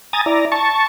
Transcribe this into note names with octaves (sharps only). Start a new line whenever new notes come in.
G#5 A#5 D#6 A6
E4 D5 A#5
A5 C#6